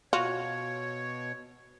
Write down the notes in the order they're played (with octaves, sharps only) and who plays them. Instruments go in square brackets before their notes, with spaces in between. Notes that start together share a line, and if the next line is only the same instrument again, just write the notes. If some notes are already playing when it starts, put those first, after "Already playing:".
[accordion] B2 C#5 [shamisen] F4 [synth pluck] F#4